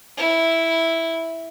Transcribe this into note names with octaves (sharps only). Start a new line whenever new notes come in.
E4